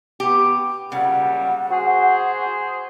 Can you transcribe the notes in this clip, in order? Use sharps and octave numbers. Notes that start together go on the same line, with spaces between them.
B3 G4
A#2 C#3 F#3 G3 F#5
F#4 G#4 C5